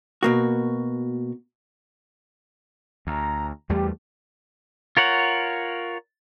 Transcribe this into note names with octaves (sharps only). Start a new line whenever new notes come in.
B2 A#3 F#4
D2 A#5
E2 G3 A3 G4
F4 A#4 C#5 F#5